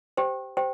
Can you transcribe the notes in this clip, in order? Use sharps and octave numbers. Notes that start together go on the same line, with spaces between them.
G4 C5 G5
G4 C5 G5